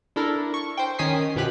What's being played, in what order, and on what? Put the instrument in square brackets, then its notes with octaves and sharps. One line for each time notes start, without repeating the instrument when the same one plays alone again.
[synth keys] D4 E4 A4 A#4
C#6
C5 G5
D#3 C#4 G#5 D#6 B6 C7
F#2 B2 F3 G4 B4 B5